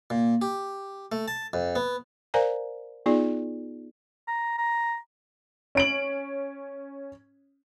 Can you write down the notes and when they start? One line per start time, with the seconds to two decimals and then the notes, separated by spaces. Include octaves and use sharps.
0.10 A#2
0.42 G4
1.12 A3
1.28 A5
1.53 F2
1.75 B3
2.34 A#4 C5 D5 F5 G#5 A#5
3.06 B3 D#4 F4 G#4 D5
4.28 A#5
4.58 A#5
5.75 C#4 D7 F#7